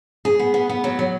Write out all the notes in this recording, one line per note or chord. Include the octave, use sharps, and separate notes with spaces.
G#4
B3
B3
B3
F#3
F#3